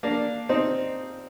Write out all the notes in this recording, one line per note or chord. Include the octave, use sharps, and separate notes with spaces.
A#3 D4
C4 D#4